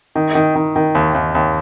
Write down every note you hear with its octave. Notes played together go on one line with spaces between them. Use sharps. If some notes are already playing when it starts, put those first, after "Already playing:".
D#3
D#3
D#3
D#3
D#2
D#2
D#2